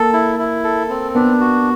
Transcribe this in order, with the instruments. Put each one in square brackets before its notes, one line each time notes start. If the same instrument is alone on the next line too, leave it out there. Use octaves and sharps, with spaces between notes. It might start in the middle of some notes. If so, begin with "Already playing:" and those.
Already playing: [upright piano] A#3 [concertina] A4
[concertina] E4
E4
A4
C4
[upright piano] B3 [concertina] D4
[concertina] F#4